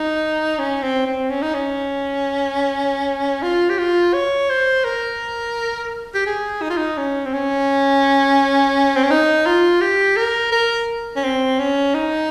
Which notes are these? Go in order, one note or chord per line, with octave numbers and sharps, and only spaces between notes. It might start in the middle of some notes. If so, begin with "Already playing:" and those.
Already playing: D#4
C#4
C4
C4
C#4
D#4
C#4
F4
G4
F4
C#5
C5
A#4
G4
G#4
D#4
F4
D#4
C#4
C4
C#4
C4
C#4
D#4
F4
G4
A#4
A#4
C#4
C4
C#4
D#4